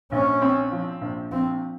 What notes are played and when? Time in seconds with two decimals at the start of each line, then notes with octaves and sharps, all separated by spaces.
0.12 A#1 C#4
0.42 C4
0.71 F3
1.01 A#1
1.31 F3 C4